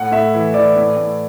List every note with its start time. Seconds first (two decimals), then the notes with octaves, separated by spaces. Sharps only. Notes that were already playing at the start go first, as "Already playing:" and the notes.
Already playing: A2 F#5
0.12 A2 E5
0.34 E3
0.54 E3 D5
0.76 A2
0.97 A2